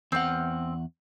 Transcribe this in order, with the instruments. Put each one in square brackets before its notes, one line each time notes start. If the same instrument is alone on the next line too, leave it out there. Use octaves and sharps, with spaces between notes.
[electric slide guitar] E2 F#5 [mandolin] C4 F6